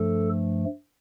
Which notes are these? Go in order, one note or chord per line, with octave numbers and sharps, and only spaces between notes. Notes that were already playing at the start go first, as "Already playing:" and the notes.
Already playing: G2 F3 A3 A4